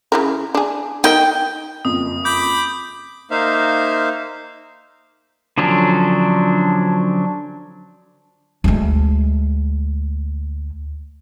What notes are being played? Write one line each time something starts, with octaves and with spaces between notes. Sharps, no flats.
C#3 E4 A#4
D4 G#4
D#4 A#4 D#5 G5
F#1 F2 D#6
B5 D6 G6
A#3 D#4 C5 E5 F5
D3 F3 F#3 C#4 D4
D2 G#3